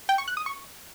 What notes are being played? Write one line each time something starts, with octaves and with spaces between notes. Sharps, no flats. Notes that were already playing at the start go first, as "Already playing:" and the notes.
G5
C#6
F#6
D#6
C#6